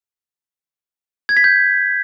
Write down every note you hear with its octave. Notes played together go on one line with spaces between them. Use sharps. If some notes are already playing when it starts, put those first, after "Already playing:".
G#6
B6
G6